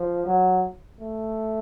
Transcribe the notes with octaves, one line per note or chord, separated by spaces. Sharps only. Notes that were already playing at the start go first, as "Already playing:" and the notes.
Already playing: F3
F#3
A3